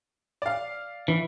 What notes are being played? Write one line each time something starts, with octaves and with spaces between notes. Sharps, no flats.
D5 F5
E3